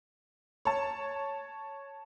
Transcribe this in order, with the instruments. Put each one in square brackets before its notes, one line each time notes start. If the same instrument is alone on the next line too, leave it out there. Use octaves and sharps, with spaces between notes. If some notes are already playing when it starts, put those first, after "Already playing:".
[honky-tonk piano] C#5 A5